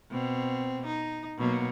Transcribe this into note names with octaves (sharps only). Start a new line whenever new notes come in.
B2 C4
D#4
B2 F#3 A#3